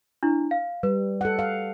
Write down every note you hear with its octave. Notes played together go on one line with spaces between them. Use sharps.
D4 E4
F5
G3 B4
A4 F#5
F5